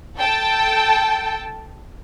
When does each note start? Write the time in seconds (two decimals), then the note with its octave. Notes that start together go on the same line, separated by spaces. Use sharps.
0.17 A4 G5 A5